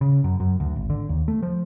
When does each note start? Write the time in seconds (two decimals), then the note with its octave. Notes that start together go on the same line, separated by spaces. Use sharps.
0.01 C#3
0.24 F#2
0.40 F#2
0.60 D2
0.76 G#1
0.90 D3
1.09 D#2
1.28 A3
1.42 F3